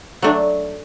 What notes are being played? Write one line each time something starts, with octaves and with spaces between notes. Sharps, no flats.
F#3 A3 D4